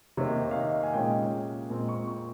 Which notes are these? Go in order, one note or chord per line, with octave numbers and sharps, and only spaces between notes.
C3 D#3 A#3 C#5
F5
D#5
G#5
A#2 G#3 C#4 G5
A#2 G#3 C4
C#6
C#6